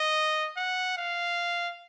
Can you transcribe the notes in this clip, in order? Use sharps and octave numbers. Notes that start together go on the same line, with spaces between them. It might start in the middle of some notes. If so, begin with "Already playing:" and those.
Already playing: D#5
F#5
F5